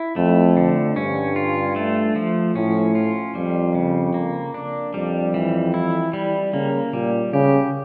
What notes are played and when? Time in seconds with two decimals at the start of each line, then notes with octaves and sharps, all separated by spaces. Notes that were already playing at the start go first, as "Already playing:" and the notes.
Already playing: E4
0.16 F2 A3
0.57 D3
0.96 G2 C#4
1.36 F4
1.76 A3
2.16 F3
2.55 A2 C#4
2.95 F4
3.35 F2 G3
3.75 C#3
4.14 A#3
4.54 D4
4.94 F2 G3
5.34 E3
5.74 E4
6.13 G3
6.53 C#3 A#3
6.93 A#2 G3
7.33 C#3 G4